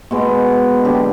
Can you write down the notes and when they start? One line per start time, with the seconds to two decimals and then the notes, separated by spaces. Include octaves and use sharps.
0.11 B2 G#3 B3
0.85 D3 F#3 A#3 G4